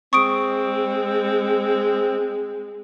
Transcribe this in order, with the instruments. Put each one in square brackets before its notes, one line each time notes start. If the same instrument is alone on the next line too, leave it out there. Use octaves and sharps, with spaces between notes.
[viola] G#3 [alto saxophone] C4 [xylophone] C#6 D#6 D7